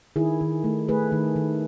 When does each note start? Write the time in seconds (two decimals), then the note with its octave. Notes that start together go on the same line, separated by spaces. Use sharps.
0.16 D#3 E4 G#4
0.41 D#3
0.64 A3
0.88 A3 G#4 B4
1.12 D#3
1.36 D#3